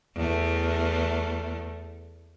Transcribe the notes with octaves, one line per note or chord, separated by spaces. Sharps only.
E2 A3